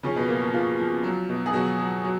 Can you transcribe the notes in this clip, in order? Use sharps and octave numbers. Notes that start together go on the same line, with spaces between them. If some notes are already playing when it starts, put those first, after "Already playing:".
C#3 F3 C#4
B2 B3
A#2 A#3
A#3
A#2 F3 F4
F3
F#3
B2
G#4
B2 F#3 F#4
F#3
F#3